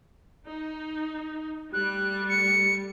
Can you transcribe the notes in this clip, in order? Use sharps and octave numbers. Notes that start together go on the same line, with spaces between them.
D#4
G3 A3 F#6
C#7